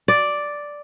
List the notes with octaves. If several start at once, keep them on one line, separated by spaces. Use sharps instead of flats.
D5